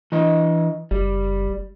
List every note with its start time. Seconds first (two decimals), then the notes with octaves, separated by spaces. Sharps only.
0.12 E3 D#5
0.91 F#1 G3